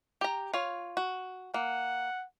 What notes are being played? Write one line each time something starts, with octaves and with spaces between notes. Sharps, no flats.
G4 A#5
F4 C#5
F#4
A#3 F#5